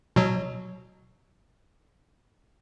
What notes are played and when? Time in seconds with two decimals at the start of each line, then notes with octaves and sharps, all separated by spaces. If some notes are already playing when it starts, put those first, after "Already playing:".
0.16 B2 F#3